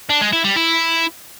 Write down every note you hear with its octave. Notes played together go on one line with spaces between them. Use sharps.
D4
G#3
E4
G3
E4